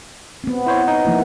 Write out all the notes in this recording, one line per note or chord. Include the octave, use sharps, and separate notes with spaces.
B3 C4
E4 C5 C#5
D#4
F3 A#3 E4